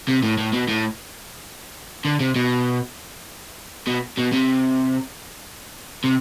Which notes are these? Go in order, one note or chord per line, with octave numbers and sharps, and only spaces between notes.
C3
A2
A2
B2
A2
D3
C3
B2
B2
B2
C3
C3